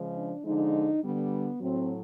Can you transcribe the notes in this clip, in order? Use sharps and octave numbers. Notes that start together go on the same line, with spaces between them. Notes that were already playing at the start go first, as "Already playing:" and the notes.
Already playing: C#3 F3 G#3
D4
D3 F3 G#3 D#4
D3 G3 B3
A2 F#3 C4